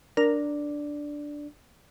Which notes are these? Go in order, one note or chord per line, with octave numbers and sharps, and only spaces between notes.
D4 A#4 D5